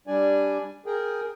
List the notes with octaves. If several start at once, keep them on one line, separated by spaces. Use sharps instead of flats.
G3 D4 D5 G#5
G#4 A#4 G5